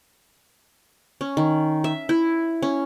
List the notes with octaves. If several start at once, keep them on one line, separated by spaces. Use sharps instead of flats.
C#4
D#3
E5
E4
C#4